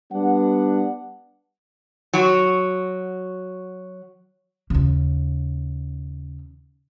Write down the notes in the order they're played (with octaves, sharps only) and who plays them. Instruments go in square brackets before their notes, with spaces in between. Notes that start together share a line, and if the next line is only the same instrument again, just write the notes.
[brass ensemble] G3 B3 D4 F#5
[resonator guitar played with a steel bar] F#3 F#4
[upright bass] D#2 C#3